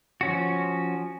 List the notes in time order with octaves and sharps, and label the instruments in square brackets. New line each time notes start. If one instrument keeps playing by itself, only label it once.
[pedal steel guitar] F3 C#4 F#4